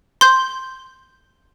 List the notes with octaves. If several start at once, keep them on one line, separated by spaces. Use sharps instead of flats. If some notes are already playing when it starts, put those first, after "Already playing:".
C6 G6